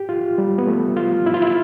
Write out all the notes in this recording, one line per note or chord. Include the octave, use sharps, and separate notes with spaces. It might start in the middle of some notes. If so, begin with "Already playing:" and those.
Already playing: G4
F4
G3
B3
A3
F4
E4
F4
E4